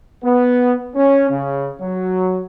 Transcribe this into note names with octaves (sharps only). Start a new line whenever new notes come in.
B3
C#4
C#3
F#3